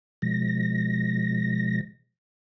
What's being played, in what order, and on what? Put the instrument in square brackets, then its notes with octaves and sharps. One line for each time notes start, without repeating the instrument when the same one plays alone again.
[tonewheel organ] B2 F3 G#3 A#6